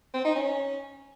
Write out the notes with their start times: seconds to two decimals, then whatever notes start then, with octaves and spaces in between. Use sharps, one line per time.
0.14 C4
0.25 D#4
0.35 C#4